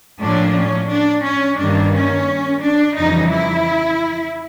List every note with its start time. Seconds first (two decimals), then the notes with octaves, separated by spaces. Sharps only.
0.21 A2 F3 A#3 C#4 D4
0.55 C#4
0.90 D4
1.24 C#4
1.59 G2 D#3 G3 A#3 D4
1.94 C#4
2.63 D4
2.98 F2 C#3 E3 G3 D#4
3.32 E4